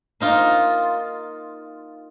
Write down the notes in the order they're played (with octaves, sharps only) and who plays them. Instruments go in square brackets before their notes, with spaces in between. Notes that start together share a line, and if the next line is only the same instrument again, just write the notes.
[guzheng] A#3 D#4 F4